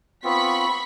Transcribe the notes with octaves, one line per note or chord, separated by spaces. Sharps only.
B3 C4 F4 B5 C#6 B6